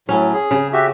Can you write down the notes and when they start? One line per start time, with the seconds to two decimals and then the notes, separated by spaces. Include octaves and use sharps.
0.09 A2 F#3 C#4
0.33 G#4
0.51 C#3
0.73 F#4 G4 E5